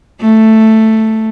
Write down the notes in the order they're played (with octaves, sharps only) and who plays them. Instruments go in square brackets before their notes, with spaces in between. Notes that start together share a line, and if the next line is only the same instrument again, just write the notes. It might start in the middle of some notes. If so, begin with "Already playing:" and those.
[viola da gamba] A3